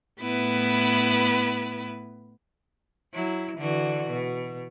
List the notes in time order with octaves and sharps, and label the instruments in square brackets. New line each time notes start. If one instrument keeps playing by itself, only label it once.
[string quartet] A2 B3 E4 B4
[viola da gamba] F#3 E4
D3 E3 F#4
B2